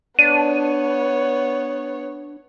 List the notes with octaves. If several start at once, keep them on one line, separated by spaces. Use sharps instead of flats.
B3 D4 C#5 D#7